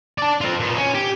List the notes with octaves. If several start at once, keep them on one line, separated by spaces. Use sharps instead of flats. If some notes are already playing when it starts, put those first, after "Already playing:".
D5 A5
C4 F4
A#2 B3
C#4
G4